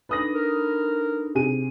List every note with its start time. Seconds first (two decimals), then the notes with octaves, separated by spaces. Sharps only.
0.09 D4 D#4 A4 B4 D#6 A#6
0.34 A#4
1.35 C3 G#4 D#7